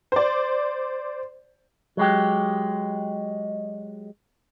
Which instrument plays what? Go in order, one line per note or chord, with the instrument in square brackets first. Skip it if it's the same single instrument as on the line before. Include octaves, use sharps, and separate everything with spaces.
[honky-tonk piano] C5 D5
[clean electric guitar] F#3 G#3 G4